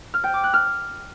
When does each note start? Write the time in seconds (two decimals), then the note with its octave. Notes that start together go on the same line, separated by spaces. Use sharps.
0.14 F6
0.24 G5
0.34 D6
0.44 F#6
0.53 F6